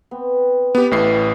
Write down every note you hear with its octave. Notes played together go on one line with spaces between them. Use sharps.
B3 C4
B3 G4 B4 G5
A1 A2 C7